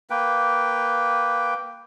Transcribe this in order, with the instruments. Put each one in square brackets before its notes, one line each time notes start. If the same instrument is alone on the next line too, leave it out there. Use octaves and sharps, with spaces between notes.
[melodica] A#3 B4 G5